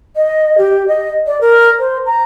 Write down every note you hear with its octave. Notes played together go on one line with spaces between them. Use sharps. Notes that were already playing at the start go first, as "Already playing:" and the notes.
D#5
G4
D#5
D5
A#4
C5
A#5